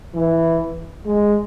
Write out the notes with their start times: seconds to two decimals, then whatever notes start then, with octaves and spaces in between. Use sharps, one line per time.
0.14 E3
1.05 G#3